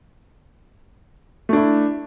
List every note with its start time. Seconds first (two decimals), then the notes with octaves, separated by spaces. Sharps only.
1.49 A3
1.53 D4
1.57 E4